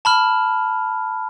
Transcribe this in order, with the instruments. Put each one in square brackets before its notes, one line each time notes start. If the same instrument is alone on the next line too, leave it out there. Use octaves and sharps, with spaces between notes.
[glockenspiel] A5 B5 F6